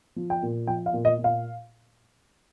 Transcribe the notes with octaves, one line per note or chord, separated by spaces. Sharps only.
F3
G5
A#2
F3 G5
F5
A#2
D#5
A#2
F5